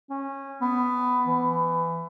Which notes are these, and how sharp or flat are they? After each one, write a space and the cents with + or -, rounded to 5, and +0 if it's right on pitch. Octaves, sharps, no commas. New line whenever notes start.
C#4 -15
B3 +10
E3 +20